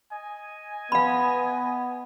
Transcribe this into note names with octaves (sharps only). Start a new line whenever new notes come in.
D#5 G#5
B3 F5 B5